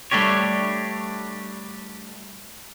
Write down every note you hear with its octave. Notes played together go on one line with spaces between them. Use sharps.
G3 A3 D4 G4 C#5